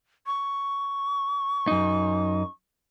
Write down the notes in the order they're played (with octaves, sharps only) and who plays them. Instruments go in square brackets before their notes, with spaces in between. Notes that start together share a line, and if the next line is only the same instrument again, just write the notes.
[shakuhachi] C#6
[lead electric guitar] F#2 D#4